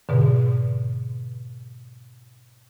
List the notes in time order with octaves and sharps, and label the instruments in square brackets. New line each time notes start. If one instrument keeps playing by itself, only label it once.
[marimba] G#2 B2 D3